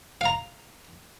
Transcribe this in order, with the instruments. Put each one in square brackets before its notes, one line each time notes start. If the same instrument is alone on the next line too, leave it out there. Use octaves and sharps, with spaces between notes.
[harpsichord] F5 A#5